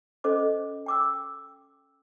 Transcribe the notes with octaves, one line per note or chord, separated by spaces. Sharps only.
C#4 A4 C5 D#5 D6
G5 D6 E6